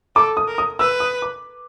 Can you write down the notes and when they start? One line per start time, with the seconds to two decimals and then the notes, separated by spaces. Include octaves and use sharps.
0.15 A4 D6
0.37 D#6
0.48 A#4
0.58 D#6
0.79 B4 E6
1.00 D#6
1.22 D6